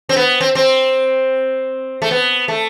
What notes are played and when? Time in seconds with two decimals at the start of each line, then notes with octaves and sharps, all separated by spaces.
0.09 C4
0.16 B3
0.41 C4
0.55 C4
2.02 A3
2.11 B3
2.48 A3